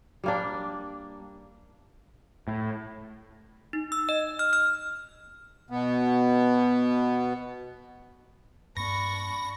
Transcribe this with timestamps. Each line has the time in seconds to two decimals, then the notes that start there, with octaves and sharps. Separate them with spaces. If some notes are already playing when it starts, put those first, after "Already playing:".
0.24 G3 A#3 D4
2.48 A2
3.73 D#4
3.92 E6
4.09 D#5
4.39 F6
4.53 F6
5.70 B2 B3
8.77 G2 A#3 D4 B5 C#6 A#6